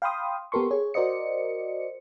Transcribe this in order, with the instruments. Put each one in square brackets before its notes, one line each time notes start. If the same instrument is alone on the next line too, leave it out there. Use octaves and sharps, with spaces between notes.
[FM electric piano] F5 G5 B5 C6 D#6
B3 G4 A4 A#4 C6 C#6
G#4 C#5
F#4 A#4 C5 D5 D#5 C#7